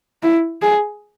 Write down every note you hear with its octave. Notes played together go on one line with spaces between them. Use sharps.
E4
G#4